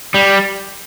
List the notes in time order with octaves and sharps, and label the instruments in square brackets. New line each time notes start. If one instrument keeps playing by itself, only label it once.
[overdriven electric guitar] G3